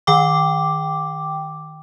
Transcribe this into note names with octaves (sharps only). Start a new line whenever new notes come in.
D#3 G5 D6